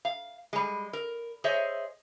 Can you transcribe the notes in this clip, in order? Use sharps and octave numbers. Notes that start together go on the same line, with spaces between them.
F5
G3 G#3
A#4
G#4 C5 C#5 D#5 E5